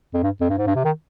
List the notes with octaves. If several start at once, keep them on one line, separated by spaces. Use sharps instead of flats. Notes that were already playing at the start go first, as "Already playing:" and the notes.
F2
G2
F2
G2
G#2
G2
C3
D#3